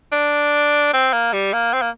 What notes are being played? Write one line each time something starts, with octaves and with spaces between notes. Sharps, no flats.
D4
C4
A#3
G3
A#3
C4
A#3